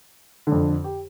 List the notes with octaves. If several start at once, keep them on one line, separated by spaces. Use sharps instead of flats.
D3
F2
G4